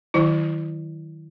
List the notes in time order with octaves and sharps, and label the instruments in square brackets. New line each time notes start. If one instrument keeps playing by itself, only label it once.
[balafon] D#3 F#3 E4